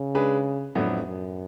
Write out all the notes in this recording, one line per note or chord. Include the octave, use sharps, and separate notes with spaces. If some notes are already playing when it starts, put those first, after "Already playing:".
Already playing: C#3
G#3 D4 G#4 B4
F2 A2 F#3 B3 D4
F#2